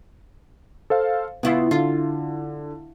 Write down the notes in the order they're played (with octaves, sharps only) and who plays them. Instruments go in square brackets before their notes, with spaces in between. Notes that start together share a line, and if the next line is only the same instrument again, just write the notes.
[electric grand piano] A4 C5 F5
[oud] C#3 E4 F4 [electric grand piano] B3
[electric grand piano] D3 [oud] F4